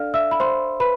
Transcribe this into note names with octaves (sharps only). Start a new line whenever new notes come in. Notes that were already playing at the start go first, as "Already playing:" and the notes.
Already playing: D4 A4 D5 F5 F6
E5 E6
B5
C5 C6
B4 B5